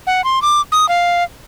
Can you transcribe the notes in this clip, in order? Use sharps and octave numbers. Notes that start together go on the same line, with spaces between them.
F#5
C6
D6
D#6
F5